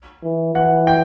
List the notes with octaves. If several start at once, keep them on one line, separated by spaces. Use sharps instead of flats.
E3
E3 F#5
G5